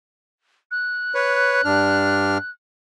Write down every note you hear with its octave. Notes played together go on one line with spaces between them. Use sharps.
F#6
B4 C#5
G2 D4 F6